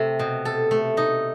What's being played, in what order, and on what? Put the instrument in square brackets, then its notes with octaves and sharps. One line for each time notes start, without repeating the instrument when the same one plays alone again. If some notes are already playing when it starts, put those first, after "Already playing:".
Already playing: [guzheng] C3 A3
B2
A4
A3
D#4